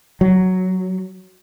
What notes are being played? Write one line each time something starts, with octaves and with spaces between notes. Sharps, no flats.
F#3